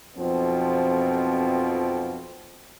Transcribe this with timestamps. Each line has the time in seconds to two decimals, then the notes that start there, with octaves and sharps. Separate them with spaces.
0.17 B1 F2 B2 F3 C4